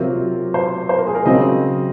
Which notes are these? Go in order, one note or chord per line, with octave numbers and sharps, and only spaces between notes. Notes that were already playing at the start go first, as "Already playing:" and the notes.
Already playing: C3 F#3 C4 F4 A#4
C5
C5
A#4
G#4
A#4
C#3 F#3 C4 D#5